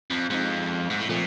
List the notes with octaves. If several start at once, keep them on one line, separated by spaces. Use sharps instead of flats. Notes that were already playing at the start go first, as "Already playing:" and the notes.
F2
F2 G#3 C4 D#4
G#2
A2
A#2 F3 A3 C4